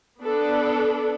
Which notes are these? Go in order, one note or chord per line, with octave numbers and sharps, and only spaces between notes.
B3 D4 A4 B4